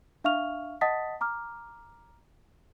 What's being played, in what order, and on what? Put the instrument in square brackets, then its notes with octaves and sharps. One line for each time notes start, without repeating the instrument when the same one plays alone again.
[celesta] D4 E5 F5 C#6 F6 F7
D#5 F#5 A5 D#6 A6 B6
A#5 D6 F6